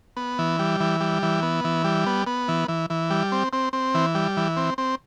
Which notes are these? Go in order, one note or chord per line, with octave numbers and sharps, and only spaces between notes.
B3
E3
G3
E3
G3
E3
B3
E3
G3
B3
B3
E3
E3
E3
G3
C4
C4
C4
E3
G3
E3
C4
C4